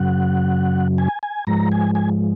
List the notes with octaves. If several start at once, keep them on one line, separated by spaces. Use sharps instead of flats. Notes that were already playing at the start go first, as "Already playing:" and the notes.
Already playing: F#2 C#3 F#3 F#5
G#5
G#5
G#2 F3 G#3 A#5
G#5
G#5